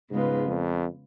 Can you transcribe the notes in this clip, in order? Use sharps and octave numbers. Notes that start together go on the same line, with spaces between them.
G#2 C#3 G#3 B3 F4 B4
F2